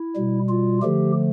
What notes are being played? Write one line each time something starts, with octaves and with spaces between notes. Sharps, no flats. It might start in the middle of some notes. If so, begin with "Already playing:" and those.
Already playing: E4
B2 G3
F4
D3 F3 A3 G4